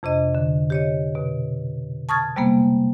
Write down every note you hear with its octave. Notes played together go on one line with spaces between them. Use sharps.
F2 C3 D4 D#5
D3
G4 C#5 D#5
B2
A5 C#6 D#6 F6 G#6 A6
C3 G3 G#3 A#3 B3